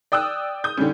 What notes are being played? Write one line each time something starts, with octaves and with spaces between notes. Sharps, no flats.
D5 G5 D#6 E6 F#6
D#6 G6
D3 D#3 G3 C#4